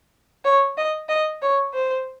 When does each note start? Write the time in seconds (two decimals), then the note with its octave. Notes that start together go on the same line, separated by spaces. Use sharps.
0.45 C#5
0.77 D#5
1.09 D#5
1.42 C#5
1.74 C5